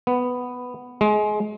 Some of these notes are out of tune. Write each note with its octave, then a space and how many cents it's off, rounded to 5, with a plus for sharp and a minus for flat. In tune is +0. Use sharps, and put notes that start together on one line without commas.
B3 +5
G#3 +25